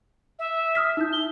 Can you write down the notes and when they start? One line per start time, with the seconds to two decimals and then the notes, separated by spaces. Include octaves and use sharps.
0.39 E5
0.75 D#6 F6 B6
0.97 D#4 E4 G6
1.12 G7